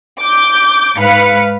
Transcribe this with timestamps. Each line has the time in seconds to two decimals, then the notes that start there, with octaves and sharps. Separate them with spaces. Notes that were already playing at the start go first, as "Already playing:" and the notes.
0.21 D6 G6
0.98 G#2 B4 F5 C#7